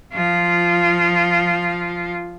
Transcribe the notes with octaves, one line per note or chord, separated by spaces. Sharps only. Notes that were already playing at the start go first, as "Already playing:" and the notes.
F3 F4